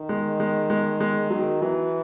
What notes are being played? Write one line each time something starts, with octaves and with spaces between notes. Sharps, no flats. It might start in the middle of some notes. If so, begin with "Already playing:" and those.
Already playing: D#3
G#3
G#3
G#3
G#3
D#3 F#3
E3 F#3